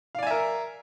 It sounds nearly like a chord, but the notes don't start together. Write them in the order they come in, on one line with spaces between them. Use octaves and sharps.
F5 D5 G#5 E5 A#4